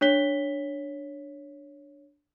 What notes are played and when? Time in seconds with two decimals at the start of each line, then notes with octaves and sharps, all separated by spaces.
0.01 D4 C#5 B6 G7